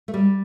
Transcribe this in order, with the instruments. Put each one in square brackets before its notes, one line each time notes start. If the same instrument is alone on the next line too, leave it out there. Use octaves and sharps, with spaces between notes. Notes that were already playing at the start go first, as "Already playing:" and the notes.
[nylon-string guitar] A3
G3